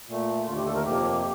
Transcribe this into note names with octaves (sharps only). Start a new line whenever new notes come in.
A#2 A3
D#2 D3 A3 F4
G4
A4
A#4
F2 C3 F3 A#3 G4